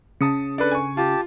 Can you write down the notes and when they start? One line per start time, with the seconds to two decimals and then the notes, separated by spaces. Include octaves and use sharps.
0.21 C#3 A5 D#6 C#7
0.58 D4 A4 B4
0.71 G#5 C#6
0.97 F4 G4 A5